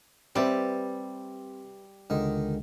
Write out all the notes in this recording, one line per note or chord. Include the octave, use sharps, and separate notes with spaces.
G3 C4 G4 B4 E5 A5
C#2 D3 D#3 G#3